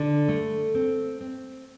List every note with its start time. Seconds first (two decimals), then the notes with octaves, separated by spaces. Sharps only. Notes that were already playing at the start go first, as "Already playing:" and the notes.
Already playing: D3
0.28 A3
0.75 C4
1.21 C4